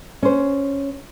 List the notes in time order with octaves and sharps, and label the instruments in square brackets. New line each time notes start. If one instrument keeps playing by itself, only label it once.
[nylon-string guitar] C#4 C5